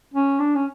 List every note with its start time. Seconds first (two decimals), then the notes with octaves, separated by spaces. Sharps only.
0.14 C#4
0.40 D4
0.55 C#4